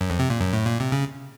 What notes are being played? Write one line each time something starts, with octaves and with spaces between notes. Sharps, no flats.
F#2
F2
C3
A#2
F#2
A2
A#2
C3
C#3